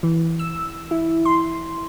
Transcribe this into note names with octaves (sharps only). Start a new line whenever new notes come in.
E3
E6
E4
C6